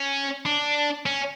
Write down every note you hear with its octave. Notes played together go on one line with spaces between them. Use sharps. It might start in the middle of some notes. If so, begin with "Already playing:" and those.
Already playing: C#4
D4
C#4